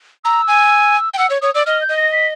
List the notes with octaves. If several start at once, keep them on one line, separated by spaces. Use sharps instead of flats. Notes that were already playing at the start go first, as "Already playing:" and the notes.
A#5 E6
G#5
G5
F#5 E6
C#5
C#5 D#6
D5 E6
D#5 F6
G6
D#5
A#6
B6